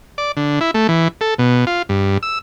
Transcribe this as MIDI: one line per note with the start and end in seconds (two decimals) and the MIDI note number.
0.18 0.32 74
0.37 0.59 50
0.61 0.71 64
0.74 0.87 57
0.89 1.08 52
1.21 1.34 69
1.38 1.65 47
1.67 1.82 65
1.89 2.18 43
2.23 2.39 88